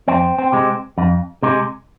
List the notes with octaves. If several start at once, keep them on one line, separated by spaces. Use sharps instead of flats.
F2 C4
C4
C3 G#3
F2
C3 G#3